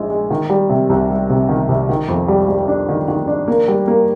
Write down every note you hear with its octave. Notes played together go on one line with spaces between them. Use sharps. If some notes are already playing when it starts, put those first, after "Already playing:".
Already playing: A#1 G#3 D#4
G#3
D#3
G3
C3
C2
G3
C3
D#3
C2
D#3
F2
G3
G3
D4
D#3
D#3
D4
A#3
G3
A#3